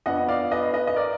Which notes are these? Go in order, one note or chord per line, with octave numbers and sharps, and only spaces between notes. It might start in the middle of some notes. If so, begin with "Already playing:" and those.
F2 F3 B3 D4 D#5 F#5
D5 F5
B4 D#5
B4 D#5
D#5
A#4 D5